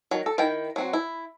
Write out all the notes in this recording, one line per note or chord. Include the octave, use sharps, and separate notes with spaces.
D#3 F#3
A4
D#3 E4 G5
F#3 C4 F#4
E4